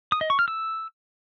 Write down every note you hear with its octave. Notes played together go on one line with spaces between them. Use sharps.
D#6
D#5
C#6
F6
E6